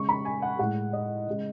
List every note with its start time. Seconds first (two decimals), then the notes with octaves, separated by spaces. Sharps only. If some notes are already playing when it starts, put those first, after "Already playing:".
Already playing: C#3 G#3 C#6
0.09 B5
0.25 G#5
0.42 F#5
0.59 A2 G#3 F#5
0.93 D#5
1.27 C#3 G#3